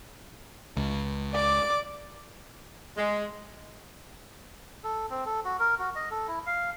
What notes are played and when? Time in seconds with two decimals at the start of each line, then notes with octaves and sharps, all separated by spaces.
0.77 C#2
1.32 D5 D6
2.97 G#3
4.84 A4
5.10 C4
5.26 A4
5.45 F#4
5.60 A#4
5.79 F#4
5.96 D#5
6.11 A4
6.28 E4
6.47 F5